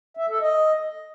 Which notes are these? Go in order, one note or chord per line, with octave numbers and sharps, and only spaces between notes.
E5
A4
D#5